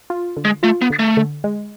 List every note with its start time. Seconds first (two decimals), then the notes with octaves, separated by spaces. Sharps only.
0.10 F4
0.37 D3
0.45 G#3
0.63 A3 F4
0.82 B3
0.90 D3
0.99 A3
1.17 D3
1.44 G#3